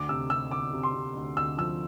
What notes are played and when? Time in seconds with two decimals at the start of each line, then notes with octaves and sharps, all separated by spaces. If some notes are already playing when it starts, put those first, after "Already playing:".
Already playing: D2 D6
0.09 C3 E6
0.30 C3 E6
0.51 D2 D6
0.73 C3
0.83 C6
0.94 C3
1.15 D2
1.37 D2 E6
1.58 F3 E6